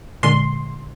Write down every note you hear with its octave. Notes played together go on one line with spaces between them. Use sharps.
A#2 D3 G#3 C6